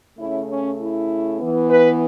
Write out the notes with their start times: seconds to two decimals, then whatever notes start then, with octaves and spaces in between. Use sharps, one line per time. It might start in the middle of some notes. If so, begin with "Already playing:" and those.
0.18 C#3 A3 C#4 E4
0.49 C#4
0.79 E4
1.38 E3 B3
1.69 B4